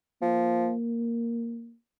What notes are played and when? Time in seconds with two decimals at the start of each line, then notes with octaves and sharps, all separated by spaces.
0.22 F3 A#3